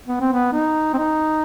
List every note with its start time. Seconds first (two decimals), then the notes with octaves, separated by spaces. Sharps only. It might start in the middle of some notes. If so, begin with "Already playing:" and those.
0.08 B3
0.21 C4
0.33 B3
0.53 D#4
0.94 C4
0.98 D#4